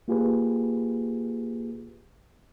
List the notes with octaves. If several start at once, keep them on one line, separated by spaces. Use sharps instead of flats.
A#3 F4 G4 G#4 B4